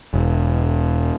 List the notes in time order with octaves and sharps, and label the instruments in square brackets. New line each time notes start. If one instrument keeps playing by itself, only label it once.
[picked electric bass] E1